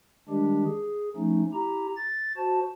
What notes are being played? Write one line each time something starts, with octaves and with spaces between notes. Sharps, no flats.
D#3 G3 G#3 D4 G4
G#4
F3 A3 C#4 D#4
E4 G4 A#5
A6
F#4 C5 A5